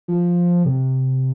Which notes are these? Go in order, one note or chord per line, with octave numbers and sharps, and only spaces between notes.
F3
C3